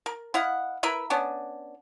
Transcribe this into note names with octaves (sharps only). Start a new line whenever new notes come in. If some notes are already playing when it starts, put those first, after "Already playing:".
A#4
E4 D#5 F5 F#5
E4 A#4 B4 E5
B3 C#4 D4